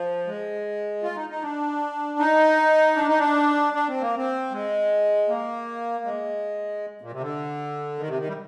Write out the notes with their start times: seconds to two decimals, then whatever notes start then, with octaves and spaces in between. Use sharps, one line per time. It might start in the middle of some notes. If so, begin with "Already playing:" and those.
Already playing: F3
0.27 G#3
1.03 F4
1.16 D#4
1.30 D#4
1.42 D4
2.19 D#4
2.96 D4
3.08 D#4
3.19 D4
3.73 D4
3.88 C4
4.01 A#3
4.16 C4
4.51 G#3
5.29 A#3
6.05 G#3
7.01 A#2
7.12 C3
7.20 D3
7.98 D#3
8.08 C3
8.18 D#3
8.28 G3